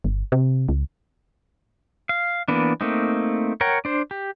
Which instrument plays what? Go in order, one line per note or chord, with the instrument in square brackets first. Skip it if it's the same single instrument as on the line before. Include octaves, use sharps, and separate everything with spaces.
[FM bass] G1
C3
C#2
[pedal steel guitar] F5
E3 A#3 B3 D4
A3 A#3 C4 D#4
A#4 C#5 F#5 G5 A#5
D4 C5
G4